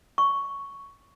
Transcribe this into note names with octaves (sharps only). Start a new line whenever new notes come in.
C#6